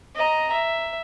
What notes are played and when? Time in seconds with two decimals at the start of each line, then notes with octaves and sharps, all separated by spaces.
0.15 D#5 A#5
0.52 E5